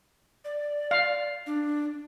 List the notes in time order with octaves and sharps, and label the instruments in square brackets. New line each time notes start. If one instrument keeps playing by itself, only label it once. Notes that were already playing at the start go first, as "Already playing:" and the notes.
[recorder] D5
[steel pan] F5
[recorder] D4